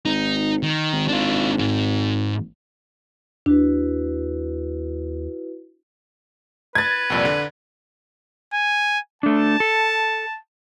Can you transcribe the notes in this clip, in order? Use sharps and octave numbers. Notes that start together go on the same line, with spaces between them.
G#1 D#4
D#3
G#1
D4 F4
G#2
D#2 D4 E4 F#4 B4
B4 G#6 A6
C2 F2 A#2 D5 G5
D3 A#4 F5
G#5
A3 D4 A5
A4